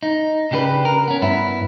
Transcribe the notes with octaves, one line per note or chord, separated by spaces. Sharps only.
D#4
C#3 D4 G4 A4 B4
A#4
B3 C#4
G2 B3 E4